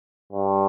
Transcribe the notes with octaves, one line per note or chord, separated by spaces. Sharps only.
G2